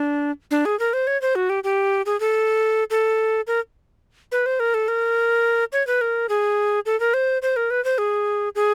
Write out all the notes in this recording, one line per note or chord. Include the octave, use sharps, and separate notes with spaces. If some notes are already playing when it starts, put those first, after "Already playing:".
Already playing: D4
D4
G#4
A#4
C5
C#5
C5
F#4
G4
G4
G#4
A4
A4
A#4
B4
C5
A#4
A4
A#4
C#5
B4
A#4
G#4
A4
A#4
C5
C5
A#4
B4
C5
G#4
G#4